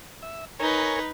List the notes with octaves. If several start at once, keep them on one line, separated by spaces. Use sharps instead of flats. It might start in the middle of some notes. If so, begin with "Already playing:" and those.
E5
D#4 A#4 B4 C#5 G#5